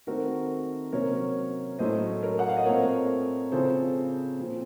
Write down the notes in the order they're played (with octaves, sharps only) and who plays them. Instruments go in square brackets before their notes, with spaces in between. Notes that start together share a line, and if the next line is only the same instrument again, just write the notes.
[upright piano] D#3 A3 C4 F#4 A#4
C3 F#3 A#3 C#4 A#4 C#5
A2 F#3 A3 C#4 C5 D#5
A#4 C#5
F#5
F5
D#5
A#2 A3 C4 A#4 C#5
C#3 F3 C4 A4 C5
A#2 F3 C4